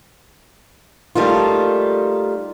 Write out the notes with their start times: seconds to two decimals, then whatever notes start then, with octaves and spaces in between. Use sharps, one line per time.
1.15 G3 A3 A#3 D#4 F4